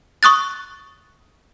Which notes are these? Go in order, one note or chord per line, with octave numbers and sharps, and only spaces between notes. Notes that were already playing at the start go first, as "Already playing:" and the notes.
C#6 D#6 F#6 A6